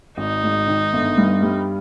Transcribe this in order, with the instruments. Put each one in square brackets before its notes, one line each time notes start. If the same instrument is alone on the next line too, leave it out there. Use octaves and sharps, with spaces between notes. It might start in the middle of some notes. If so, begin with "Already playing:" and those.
[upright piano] G#1 [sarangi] D#4
[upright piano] G#2
D#3
G1
G2
G3